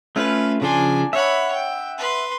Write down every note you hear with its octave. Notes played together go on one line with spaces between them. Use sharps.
A3 C#4 F4 B4
C#3 F3 D4 G#5 C6
C#5 E5 F#5 B5
G5
B4 C6